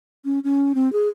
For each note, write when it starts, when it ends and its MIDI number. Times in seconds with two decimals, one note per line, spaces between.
0.25 0.39 61
0.44 0.73 61
0.75 0.92 60
0.93 1.08 68